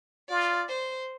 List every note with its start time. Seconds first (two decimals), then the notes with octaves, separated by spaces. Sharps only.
0.29 F4 D5
0.69 C5